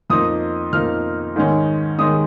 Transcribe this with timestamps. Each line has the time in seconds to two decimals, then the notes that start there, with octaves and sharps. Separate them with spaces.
0.10 F2 F3 A#3 D#4 D#6
0.73 F2 F3 A#3 D#4 F6
1.36 G#2 D#3 G#3 C#4
1.98 D#3 G#3 C#4 D#6